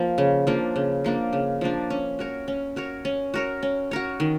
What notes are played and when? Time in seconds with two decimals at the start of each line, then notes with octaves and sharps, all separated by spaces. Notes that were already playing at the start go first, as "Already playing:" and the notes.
Already playing: F3 A#3
0.18 C#3
0.47 F3 A#3 D4
0.76 C#3
1.04 F3 A#3 D4
1.33 C#3
1.61 F3 A#3 D4
1.90 C#4
2.19 F#4 A#4 C#5
2.48 C#4
2.76 F#4 A#4 C#5
3.05 C#4
3.34 F#4 A#4 C#5
3.63 C#4
3.91 F#4 A#4 C#5
4.20 D#3